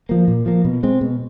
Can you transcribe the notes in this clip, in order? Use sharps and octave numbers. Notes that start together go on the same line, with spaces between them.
F3 A#3
A#2
F3 A#3
B2
G#3 C4
B2